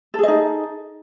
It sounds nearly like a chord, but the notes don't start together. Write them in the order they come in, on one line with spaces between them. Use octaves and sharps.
A4 G#4 D#5 D#4